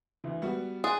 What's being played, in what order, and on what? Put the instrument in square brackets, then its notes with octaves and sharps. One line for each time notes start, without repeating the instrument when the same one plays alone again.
[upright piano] D2 E3
G3 B3 F#4
[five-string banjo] G#4 [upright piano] C6 F#6 A6